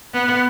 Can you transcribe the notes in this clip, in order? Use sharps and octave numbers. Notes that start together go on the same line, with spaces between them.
B3